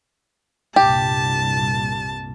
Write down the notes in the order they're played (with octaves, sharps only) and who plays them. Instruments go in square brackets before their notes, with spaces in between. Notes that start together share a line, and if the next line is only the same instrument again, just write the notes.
[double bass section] C2 G2 A#2 [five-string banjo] G4 [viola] A5